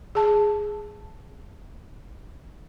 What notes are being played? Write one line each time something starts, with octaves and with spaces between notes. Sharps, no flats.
G#4 A5